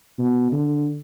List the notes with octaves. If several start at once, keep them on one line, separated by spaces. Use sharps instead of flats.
B2
D3